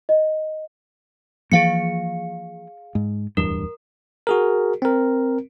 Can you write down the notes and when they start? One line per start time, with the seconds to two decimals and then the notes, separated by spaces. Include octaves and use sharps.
0.09 D#5
1.52 E3 F3 A#3 G#4 F5 C#7
2.95 G#2
3.37 D1 E2 G2 A#4
4.27 F#4 G#4 A#4
4.82 C4 A#4